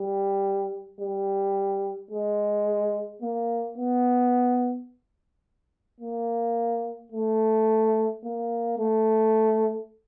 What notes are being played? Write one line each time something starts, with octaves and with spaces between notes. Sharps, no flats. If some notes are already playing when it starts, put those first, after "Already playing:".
Already playing: G3
G3
G#3
A#3
B3
A#3
A3
A#3
A3